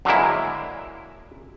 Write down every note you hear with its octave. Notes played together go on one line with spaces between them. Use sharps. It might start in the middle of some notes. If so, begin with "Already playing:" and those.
D3 F#3 G#3 A#3 E4